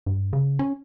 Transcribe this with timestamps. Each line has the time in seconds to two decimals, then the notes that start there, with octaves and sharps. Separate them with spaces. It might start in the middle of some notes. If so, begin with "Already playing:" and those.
0.06 G2
0.33 C#3
0.59 C#4